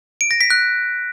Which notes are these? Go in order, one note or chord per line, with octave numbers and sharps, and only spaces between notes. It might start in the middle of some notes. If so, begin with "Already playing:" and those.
D7
A#6
B6
F#6